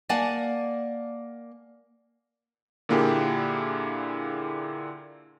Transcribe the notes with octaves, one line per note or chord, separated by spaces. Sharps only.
A#3 D5 F#5 G#5 A5
A#2 D3 A#3 E4 G4 G#4